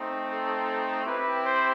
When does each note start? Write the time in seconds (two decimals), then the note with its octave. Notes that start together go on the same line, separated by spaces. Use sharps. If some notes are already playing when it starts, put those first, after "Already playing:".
Already playing: A3 C4 D#4
0.31 A4
1.05 C4 E4 G4 B4
1.43 C5